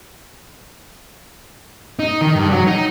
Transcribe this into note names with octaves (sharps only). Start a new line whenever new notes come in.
D#4
D#3
G2
F#3
D#4